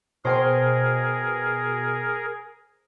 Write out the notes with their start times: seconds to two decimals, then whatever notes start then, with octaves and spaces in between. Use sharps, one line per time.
0.25 B2 G#4 A#4 C5 G5 C6